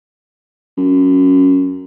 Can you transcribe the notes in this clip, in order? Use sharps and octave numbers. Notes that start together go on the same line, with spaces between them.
F#2